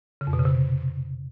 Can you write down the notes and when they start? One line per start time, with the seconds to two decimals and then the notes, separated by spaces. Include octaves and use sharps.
0.21 C#3
0.27 F2
0.33 B2
0.39 C#3
0.45 C3